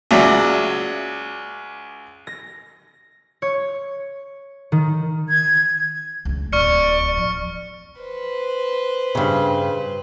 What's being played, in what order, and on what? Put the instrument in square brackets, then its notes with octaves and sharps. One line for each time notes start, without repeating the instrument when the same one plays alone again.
[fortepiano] C#2 F#3 D5 E5
[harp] A#6
C#5
D#3
[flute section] G#6
[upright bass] C#2 G#3
[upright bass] D1 [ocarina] D5 [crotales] C#6 F6 C#7
[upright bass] F3
[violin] B4 C5
[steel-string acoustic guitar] G2 C#3